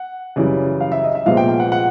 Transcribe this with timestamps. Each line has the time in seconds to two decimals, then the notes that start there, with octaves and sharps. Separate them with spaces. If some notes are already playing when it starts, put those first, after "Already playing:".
Already playing: F#5
0.36 F#2 C#3 E3 G3
0.80 F5
0.92 E5
1.04 D#5
1.15 E5
1.26 C2 A#2 F3 G#3 B3 F5
1.37 G5
1.48 G5
1.60 F#5
1.72 F#5